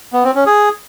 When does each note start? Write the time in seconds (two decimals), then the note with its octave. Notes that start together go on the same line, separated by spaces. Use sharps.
0.13 B3
0.24 C4
0.35 C#4
0.46 G#4